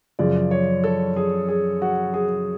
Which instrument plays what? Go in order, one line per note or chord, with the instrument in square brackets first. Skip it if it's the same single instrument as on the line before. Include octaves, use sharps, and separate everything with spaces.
[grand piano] F#2 C#3 F3 D5
C#5
A4
G#4
G#4
F#4
G#4